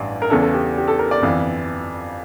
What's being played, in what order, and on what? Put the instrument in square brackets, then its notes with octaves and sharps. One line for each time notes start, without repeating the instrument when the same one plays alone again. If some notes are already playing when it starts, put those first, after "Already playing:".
Already playing: [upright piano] A1 G2 E3 D5
A#4
E2 C#3 E3 A4
A4
G4
G4
A4
A#4
D5
G1 F2 E3